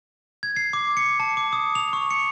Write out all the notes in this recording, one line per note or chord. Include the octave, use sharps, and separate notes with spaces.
G#6
C7
D6
C#7
A5
D6
D#6
F7
C#6
C#7